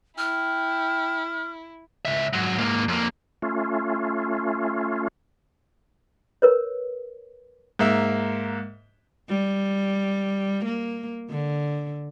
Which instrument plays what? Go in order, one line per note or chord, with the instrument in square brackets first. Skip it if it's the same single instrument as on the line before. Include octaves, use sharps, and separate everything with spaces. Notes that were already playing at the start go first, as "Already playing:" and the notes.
[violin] E4 [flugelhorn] G5 [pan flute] F6
[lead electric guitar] C#2 E5
G#2 F#3
G#2 A#3
F2 A#3
[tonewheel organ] A3 C#4 F4
[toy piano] A#4 B4 C#5
[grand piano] G#2 A#3 E5
[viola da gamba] G3
A#3
D3